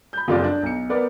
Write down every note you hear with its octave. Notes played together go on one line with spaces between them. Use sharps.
B5 G6
F#1 F2 F4 G4 D5
D4
B1 C#7
B3 A#4 B4 D5